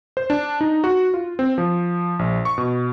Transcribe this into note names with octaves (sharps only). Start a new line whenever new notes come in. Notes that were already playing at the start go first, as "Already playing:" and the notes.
C5
D4
D#4
F#4
F4
C4
F3
A#1
C#6
B2